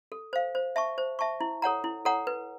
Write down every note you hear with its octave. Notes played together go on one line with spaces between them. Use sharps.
A4
C5 F5
C5
E5 A5 C#6
C5
E5 A5 C#6
E4
A4 C#5 F#5 A#5
E4
A4 C#5 F#5 A#5
B4